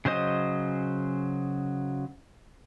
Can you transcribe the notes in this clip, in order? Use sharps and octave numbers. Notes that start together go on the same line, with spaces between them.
C#3 F#3 C5 D#5